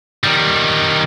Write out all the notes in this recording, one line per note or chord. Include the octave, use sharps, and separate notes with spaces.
D#3 G3